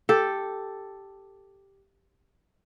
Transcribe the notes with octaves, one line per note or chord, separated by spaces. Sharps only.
G4 A4